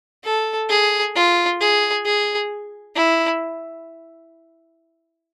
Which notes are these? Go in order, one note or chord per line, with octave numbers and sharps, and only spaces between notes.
A4
G#4
F4
G#4
G#4
E4